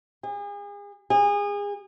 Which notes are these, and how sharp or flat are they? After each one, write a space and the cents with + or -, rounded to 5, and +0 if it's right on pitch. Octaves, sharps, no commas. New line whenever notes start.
G#4 -35
G#4 -30